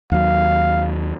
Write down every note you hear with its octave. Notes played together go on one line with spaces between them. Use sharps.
D#2 F#3 F5